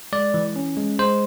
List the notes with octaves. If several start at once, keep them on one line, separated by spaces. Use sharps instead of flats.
G#3 D5
E3
C#4
G#3
G#3 C5